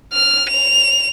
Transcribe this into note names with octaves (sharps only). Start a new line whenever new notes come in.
F6
F7